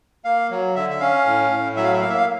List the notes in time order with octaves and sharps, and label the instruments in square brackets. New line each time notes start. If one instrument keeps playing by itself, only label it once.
[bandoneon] A#3 F5
F#3
D3 E5
E5
C#4 F5
A2
A2
F#3 E5
F5
E5
A#3 F5
E5
F5